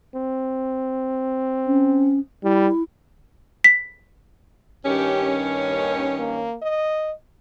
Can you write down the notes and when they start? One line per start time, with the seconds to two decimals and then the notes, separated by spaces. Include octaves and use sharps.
0.16 C4
1.66 C#4
2.44 G3 E4
3.64 B6
4.86 G2 D#3 C#4 G4
5.68 D#2
6.19 A#3
6.62 D#5